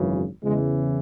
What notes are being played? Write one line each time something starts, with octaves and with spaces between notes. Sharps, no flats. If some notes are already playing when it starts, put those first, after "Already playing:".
Already playing: G#1 F#2 C#3 E3
E2 C#3 E3 G#3